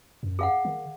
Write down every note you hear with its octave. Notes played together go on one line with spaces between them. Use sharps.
F#2
G#4 F5 F#5
D#3